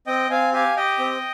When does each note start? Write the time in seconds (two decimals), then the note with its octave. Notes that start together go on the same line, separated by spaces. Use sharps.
0.07 C4 D#5 G5
0.30 C4 F5 G#5
0.53 G4 F5 G#5
0.76 G4 D#5 G5
0.99 C4